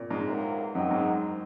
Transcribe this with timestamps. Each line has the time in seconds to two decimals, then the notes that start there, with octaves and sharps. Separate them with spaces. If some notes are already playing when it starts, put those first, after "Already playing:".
Already playing: A#2
0.11 G#2
0.26 C#2 C3 F#3 A#3
0.74 F#2 D#3 F#3 C4 D#4 F#4
0.91 G#2